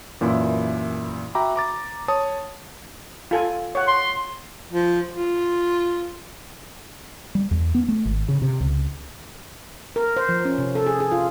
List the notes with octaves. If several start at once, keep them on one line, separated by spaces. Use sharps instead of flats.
F#2 A#2 E3 E4
F#4 E5 G5 A#5 B5 D6
A#5 D6 A6
C#5 A5 D#6
F4 A4 G#5
C#5 F#5
C6
F3
F4
G3
E2
B3
A3
G#1
C#3
C3
C#2
A#4
C5
F3
C#4
C3
A4
G#4
G#4
F4